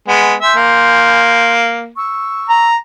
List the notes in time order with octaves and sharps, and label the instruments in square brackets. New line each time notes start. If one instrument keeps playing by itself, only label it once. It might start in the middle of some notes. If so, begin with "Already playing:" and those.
[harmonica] G#3 B3
[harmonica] E5 [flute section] G#5 C6 G6
[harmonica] A#3
[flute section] C#6 E6
[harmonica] A#5